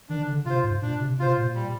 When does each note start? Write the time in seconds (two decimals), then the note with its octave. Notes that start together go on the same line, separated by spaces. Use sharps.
0.09 D#3 D4
0.27 D3
0.45 C3 F4
0.50 C5
0.63 G#2
0.82 A#2 D4
1.00 C3
1.19 C3 F4 C5
1.37 A#2
1.55 G3